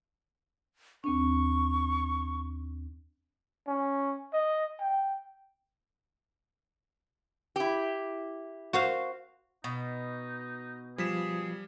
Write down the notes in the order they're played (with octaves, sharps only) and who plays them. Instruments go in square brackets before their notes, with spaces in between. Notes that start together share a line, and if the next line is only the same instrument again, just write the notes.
[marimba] D#2 C4 D4 [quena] C#6
[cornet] C#4
D#5
G5
[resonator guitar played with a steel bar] E4 G4
[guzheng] F#4 C5 F5
[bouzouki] B2 [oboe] D#4
[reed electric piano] F3 [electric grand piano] G3 B6 E7 [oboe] G#4